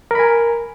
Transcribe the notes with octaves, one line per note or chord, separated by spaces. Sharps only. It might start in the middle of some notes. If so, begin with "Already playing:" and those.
A#4 G#5 B5